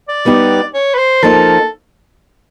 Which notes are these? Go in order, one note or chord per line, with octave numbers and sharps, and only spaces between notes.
D5
G3 B3 D#4 G4
C#5
B4
C5
F3 A#3 D#4 A4